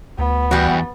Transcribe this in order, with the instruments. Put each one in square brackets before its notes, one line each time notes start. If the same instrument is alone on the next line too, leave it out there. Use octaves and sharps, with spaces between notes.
[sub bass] D2 [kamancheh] B3
[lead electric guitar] E2 [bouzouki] G3 F#4